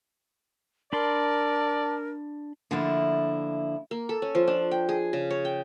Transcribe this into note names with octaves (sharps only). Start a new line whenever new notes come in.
D4 A#4 D5 A5 B5 C6
D3 F3 A3 A#3 D4 E4
A#3
A4
C#4
F3
D4
G5
G#4
C#3
C#5
G5